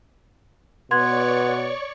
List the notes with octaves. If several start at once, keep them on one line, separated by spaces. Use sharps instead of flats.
B2 B3 C#5 D5 C6 C#6 G#6